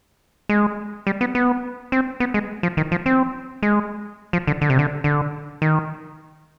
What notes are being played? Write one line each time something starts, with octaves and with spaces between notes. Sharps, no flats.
G#3
G3
B3
B3
C4
B3
G#3
F3
D#3
F3
C4
G#3
F3
D3
D3
C3
D3
D3
D#3